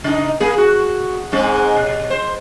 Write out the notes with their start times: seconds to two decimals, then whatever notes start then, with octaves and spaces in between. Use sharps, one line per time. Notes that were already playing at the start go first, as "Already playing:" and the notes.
0.04 C#3 D#4
0.40 A#3 G#4
0.58 F#4
1.32 G#2 G#3 C4
1.76 B2
2.10 C5